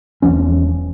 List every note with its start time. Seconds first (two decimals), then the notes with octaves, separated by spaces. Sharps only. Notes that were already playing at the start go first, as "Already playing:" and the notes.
0.22 E1 E2 F3 C#4